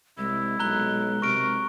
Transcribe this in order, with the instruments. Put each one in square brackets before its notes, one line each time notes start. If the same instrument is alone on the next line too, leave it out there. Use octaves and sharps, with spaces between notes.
[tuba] C2 [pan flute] G#3 [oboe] E4
[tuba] B1 [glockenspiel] A#5 F#6 G7
[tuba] C3 [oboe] A#4 [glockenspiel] C#6 D7